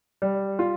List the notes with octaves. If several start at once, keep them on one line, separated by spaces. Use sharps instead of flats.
G3
F4